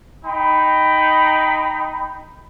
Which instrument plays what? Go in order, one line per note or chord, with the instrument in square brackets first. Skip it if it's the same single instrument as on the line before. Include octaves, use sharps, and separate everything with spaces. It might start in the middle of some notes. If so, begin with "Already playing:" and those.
[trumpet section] D#4 G5 B5